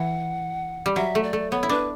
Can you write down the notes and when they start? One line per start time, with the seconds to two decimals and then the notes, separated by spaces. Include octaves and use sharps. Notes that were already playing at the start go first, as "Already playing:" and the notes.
Already playing: E3 F#5
0.86 G3
0.96 F#3 E5
1.15 A3
1.23 D5
1.33 A3
1.51 B3 C#5
1.63 E4
1.69 D4 B4